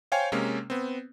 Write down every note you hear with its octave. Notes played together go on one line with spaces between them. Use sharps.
C5 C#5 F5 G5 G#5
C3 G#3 A#3 C#4
B3 C4